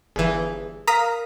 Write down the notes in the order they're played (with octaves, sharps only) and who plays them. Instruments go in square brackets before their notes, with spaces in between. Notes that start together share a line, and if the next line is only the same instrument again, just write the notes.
[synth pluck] G1 E3 [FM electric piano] G#4
[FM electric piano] A#4 F5 [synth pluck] A#5 D#6 B6